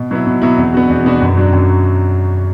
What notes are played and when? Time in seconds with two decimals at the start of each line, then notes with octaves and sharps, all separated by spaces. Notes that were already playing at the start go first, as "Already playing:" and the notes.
Already playing: B2
0.11 F#3 B3 E4
0.27 B2
0.42 F#3 B3 E4
0.57 E2
0.74 B2 B3 D4 F#4
0.90 E2
1.05 B2 B3 D4 F#4
1.21 F#2
1.37 F#3 D4 F#4
1.53 F#2